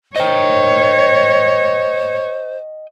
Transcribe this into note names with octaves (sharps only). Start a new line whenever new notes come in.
C5 C#5 D#5 G5